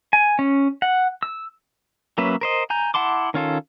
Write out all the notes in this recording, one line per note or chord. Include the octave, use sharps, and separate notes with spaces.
G#5
C#4
F#5
E6
F#3 A#3 C#4 B4 E5
A#4 C5 D#5
G#5 A#5 G6
E4 F#5 A5 C6 D6
D#3 C#4 F4 A4